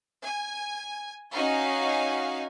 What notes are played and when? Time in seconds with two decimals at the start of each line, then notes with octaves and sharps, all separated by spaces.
0.25 G#5
1.32 C#4 D#4 F#4 F5 G#5